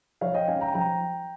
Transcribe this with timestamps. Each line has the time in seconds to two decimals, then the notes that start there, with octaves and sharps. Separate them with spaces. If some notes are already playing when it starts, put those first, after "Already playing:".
0.21 F3 C#5 F5
0.34 D#5 G5
0.48 G#3 C#4 F5 G#5
0.61 G5 A#5
0.74 F3 G5 A#5